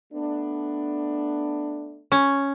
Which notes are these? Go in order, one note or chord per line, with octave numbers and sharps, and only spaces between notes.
A3 B3 D4
C#4